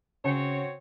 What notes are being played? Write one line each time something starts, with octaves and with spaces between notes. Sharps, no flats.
C#3 C4 F#4 C#5